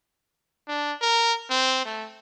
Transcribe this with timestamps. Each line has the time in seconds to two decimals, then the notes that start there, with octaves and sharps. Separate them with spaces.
0.68 D4
1.02 A#4
1.50 C4
1.85 A3